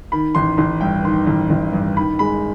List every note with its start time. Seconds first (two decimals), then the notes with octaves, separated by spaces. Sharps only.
0.12 D#3 B5
0.35 A1 C6
0.58 A1 C6
0.81 G2 G5
1.04 D#3 C6
1.27 A1
1.50 A1
1.73 G2
1.97 D#3 B5
2.19 G#3 B5